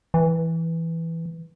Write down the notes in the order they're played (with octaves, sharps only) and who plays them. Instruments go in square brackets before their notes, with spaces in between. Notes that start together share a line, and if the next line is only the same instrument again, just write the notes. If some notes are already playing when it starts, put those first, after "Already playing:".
[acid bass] E3